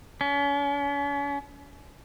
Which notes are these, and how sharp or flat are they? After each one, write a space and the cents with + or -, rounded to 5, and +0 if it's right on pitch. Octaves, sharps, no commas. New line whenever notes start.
C#4 +40